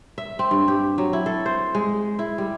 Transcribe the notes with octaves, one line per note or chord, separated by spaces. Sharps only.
E5
C4
G2
G4
F#3
E4
A4
C5
G#3
E4
G3